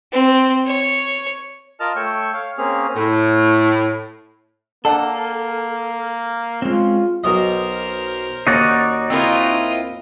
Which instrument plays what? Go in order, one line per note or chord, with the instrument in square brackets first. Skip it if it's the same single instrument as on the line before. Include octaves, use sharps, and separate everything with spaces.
[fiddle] C4
C#5
[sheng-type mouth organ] F4 A#4 D#5 A5 F6
A3 C#5 G5 C#6 E6
C#5 F5
A#3 C4 C#4 G#4 F6
[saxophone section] A2
[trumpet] A#3 [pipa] D4 F#5 [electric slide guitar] A4
[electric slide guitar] G#3 C4 [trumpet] C#4 [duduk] F4
[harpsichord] B1 D#5 [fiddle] A#4 C5
[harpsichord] D#2 [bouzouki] C#4 [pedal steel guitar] D#4 F#4 D5
[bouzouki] C4 E4 A#4 [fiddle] F4 D#5